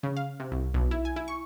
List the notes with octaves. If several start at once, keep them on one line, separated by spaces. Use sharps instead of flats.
C#3
F5
C3
C2
B1
E4
G#5
E4
C#6